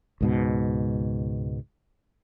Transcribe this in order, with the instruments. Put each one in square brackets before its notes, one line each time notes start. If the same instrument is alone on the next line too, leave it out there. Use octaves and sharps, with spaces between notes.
[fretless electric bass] C#2 G#2 B2